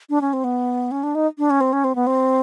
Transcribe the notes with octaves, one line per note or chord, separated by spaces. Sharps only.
D4
C#4
C4
B3
C#4
D4
D#4
D4
C#4
C4
C#4
C4
B3
C4